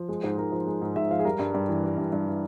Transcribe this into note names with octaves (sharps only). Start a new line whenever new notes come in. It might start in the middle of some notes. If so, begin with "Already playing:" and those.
Already playing: F3
G#3
G#2 C5
G#2 A#4
F3
G#3
G#2
G#2 E5
F3 F5
G#4
G3 A#4
G2
G2
E3
G3
G2
G2
E3